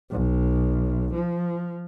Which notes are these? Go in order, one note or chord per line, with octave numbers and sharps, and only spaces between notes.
B1
F3